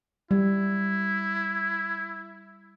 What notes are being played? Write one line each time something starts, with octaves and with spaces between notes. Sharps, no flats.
G3 E4